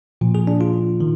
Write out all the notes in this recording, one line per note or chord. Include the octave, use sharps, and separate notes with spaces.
A#2 F3
G#4
D4
F4
D#3